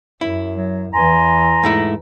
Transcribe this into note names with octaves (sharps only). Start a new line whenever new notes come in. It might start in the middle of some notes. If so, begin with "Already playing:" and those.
F#2 E4
F#3
E2 E3 G#5 A#5 C6
G#2 A3 E4